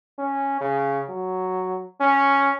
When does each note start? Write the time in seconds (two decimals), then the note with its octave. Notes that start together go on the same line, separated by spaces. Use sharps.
0.18 C#4
0.61 C#3
1.09 F#3
2.00 C#4